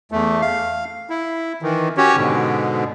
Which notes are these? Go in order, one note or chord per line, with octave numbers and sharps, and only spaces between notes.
E2 A3
F5
E4
D#3 E3
C#4 F#4 G4 C#5
G#2 B2 D3